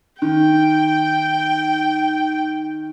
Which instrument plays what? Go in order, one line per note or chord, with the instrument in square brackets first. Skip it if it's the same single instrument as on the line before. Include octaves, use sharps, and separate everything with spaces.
[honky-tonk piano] D#3 [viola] G5